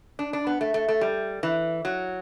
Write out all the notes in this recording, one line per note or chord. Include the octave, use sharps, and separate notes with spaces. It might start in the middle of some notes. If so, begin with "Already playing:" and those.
D4
D4
B3
A3
A3
A3
G3
E3
F#3